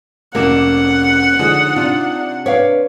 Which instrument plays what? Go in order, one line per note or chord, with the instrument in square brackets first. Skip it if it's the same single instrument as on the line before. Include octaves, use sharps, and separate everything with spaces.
[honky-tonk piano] F1 D6 E7 [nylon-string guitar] A#3 [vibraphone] C#4 [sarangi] F#5
[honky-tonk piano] D3 F3 G#3 [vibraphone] D#4
[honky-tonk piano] C3 D4 [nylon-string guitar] F4
[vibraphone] B4 [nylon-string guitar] C#5 D5 F5